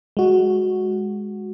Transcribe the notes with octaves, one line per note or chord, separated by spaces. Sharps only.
G#3 F#4